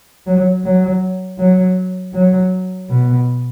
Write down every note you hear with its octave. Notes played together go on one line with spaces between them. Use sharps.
F#3
F#3
F#3
F#3
B2